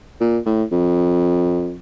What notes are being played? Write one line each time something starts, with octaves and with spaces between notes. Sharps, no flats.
A#2
A2
F2